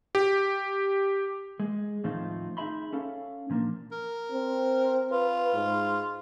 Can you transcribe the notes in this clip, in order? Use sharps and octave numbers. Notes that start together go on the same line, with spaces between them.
G4
G#3
D#2 A2 F3 C4 D#4 F4
D#4 G#4 E5 B5 C6
C#4 A4 F5
A#2 F3 A#3 D4
A#4
C4
F4 B4
G#2